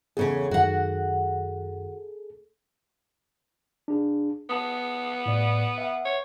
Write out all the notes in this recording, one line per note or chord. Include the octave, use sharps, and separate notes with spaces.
E2 C#3 C#4 G#4 A4
F#2 D#3 F#4 F#5
D4 G#4
B3 A5 D#6
A2 D5
E5 F#5
C#5